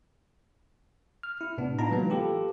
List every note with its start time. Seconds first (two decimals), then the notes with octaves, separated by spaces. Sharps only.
1.23 F6
1.41 E4
1.58 A2 C3 B3 D4
1.79 B3 D#4 F4 B4 A5 A#5
1.91 E3 F#3 G#3 A#3 B3
2.10 F4 G4 A4 B4